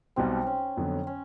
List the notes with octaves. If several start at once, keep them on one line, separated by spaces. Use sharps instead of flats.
B1 B2 G3 B3 C4
C#4
F2 D3 F#3 B3
C#4